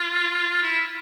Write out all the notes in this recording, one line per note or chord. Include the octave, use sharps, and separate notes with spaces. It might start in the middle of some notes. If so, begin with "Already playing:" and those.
Already playing: F4
E4